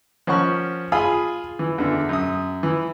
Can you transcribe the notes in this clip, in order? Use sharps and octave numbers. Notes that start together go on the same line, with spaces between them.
F3 C#4 A#4 F#5 C#6
F4 G#4 F5 G#5 B5 D#6
E3
E2 D3
F#2 D#6
E3